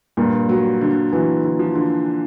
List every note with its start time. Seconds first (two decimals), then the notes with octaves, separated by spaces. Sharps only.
0.17 G2 A#2
0.49 F#3
0.81 D3
1.12 E3 F#3
1.44 D3
1.59 F3
1.75 D3